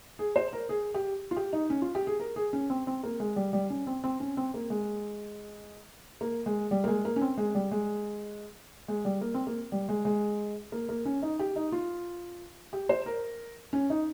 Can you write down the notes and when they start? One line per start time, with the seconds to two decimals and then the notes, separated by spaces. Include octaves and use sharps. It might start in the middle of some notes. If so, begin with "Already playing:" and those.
0.19 G#4
0.36 C5
0.53 A#4
0.69 G#4
0.94 G4
1.31 F4
1.36 G4
1.53 D#4
1.70 C#4
1.82 F4
1.95 G4
2.07 G#4
2.20 A#4
2.36 G#4
2.53 C#4
2.70 C4
2.87 C4
3.03 A#3
3.20 G#3
3.36 G3
3.53 G3
3.70 C#4
3.87 C4
4.04 C4
4.20 C#4
4.37 C4
4.54 A#3
4.70 G#3
6.21 A#3
6.46 G#3
6.71 G3
6.84 A#3
6.88 G#3
7.05 A#3
7.16 C#4
7.21 C4
7.38 G#3
7.55 G3
7.72 G#3
8.88 G#3
9.05 G3
9.21 A#3
9.34 C4
9.47 A#3
9.72 G3
9.89 G#3
10.05 G#3
10.72 A#3
10.89 A#3
11.05 C#4
11.22 D#4
11.39 G4
11.56 D#4
11.72 F4
12.73 G4
12.89 C5
13.06 A#4
13.73 C#4
13.90 D#4